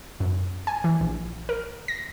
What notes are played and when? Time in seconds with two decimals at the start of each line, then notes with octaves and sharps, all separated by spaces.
0.20 F#2
0.67 G#5
0.84 E3
1.01 A#1
1.49 A#4
1.88 A#6